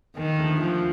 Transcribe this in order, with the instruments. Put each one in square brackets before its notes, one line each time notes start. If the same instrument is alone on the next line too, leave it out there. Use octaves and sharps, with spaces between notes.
[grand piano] D#2 [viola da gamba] D#3
[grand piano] D3 F3 A3
[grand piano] D#2 [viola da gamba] F3